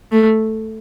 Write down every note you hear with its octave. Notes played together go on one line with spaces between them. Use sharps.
A3